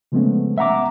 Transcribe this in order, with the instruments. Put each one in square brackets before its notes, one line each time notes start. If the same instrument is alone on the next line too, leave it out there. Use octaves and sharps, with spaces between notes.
[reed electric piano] C#3 F3 G#3 A3 B3 C#4
E5 F#5 A#5 D6